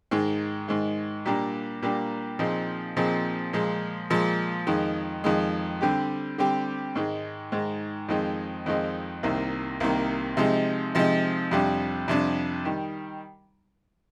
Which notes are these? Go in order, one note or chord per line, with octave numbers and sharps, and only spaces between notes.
G#2 D#3 G#3
G#2 D#3 G#3
A#2 G3 A#3 D4 G4
A#2 G3 A#3 D4 G4
A#2 F3 C4 D#4 G#4
A#2 F3 C4 D#4 G#4
A#2 F3 G#3
A#2 F3 G#3
F2 D#3 G#3
F2 D#3 G#3
D3 G3 C4 G4
D3 G3 C4 G4
G#2 D#3 G#3
G#2 D#3 G#3
F2 D#3 G#3 C4 D#4
F2 D#3 G#3 C4 D#4
C2 C3 D#3 A#3
C2 C3 D#3 A#3
C3 F3 G#3 D#4
C3 F3 G#3 D#4
F2 C3 G3 D4
F2 C3 G3 D4
D#3 G3